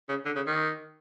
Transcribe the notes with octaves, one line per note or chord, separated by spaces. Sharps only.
C#3
D3
C#3
D#3